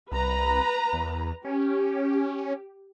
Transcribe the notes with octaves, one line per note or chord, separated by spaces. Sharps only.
C2 B4 A#5
E2
C#4 G4